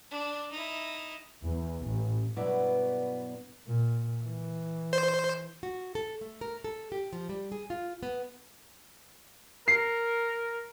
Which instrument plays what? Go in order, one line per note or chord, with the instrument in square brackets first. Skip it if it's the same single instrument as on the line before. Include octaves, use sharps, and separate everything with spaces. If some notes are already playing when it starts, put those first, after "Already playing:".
[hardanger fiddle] D4
D#4 E4
[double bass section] E2
A1
[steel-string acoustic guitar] G2 B2 F#3 B3 E4 D5
[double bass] A#2
E3
[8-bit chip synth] C5
[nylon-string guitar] F#4
A4
A3
A#4
A4
G4
F3
G3
G#4
F4
B3
[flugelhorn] A#4 [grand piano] C7